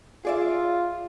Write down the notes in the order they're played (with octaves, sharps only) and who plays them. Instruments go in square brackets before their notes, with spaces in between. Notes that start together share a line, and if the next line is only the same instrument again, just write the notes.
[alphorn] F4 [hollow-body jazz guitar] G#4 D5 E5